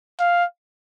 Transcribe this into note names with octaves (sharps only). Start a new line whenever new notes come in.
F5